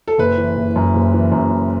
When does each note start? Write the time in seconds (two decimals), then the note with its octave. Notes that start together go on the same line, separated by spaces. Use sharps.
0.08 A4
0.18 F#1 B4
0.38 E3
0.57 F#1
0.76 F#2
0.95 F#1
1.14 E3
1.32 F#2
1.52 E3